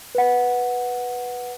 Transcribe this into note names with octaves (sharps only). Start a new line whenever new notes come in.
B4 F#5